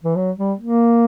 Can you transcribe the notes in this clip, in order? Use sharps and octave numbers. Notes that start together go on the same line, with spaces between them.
E3
F#3
G3
A#3